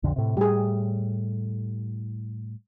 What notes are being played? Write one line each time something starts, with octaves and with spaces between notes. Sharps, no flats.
B1 F2 D3
A2 C3
A2 G3 G4 G#4